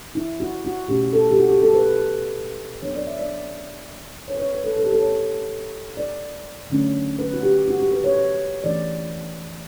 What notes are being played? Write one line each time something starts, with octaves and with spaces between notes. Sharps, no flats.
E4
F#4
F#4
B2 A3 C#4 G4
A4
G4
F#4
G4
A4
B4
F#3 B3 D4 C#5
D5
E5
D5
C#5
B4
C#5
B4
A4
B2 A3 D4 A4
G4
A4
C#5
D5
D3 F#3 A3 C#4
B4
F#4
G4
F#4
G4
B4
C#5
C#5
E3 A3 C#4 D5